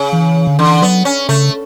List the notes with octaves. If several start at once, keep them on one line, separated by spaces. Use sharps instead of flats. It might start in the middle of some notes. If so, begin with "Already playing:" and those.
Already playing: C#3
E3
D3
D3 E3
F#3 B3
C#4
C#3 A3